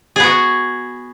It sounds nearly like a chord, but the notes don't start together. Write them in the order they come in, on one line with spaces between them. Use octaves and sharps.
G#4 B3 F#4